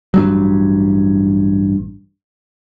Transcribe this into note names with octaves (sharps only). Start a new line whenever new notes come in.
A1 G2 F#3